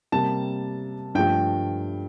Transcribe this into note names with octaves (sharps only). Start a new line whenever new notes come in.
C3 G3 A#3 A5
G2 F3 A3 G5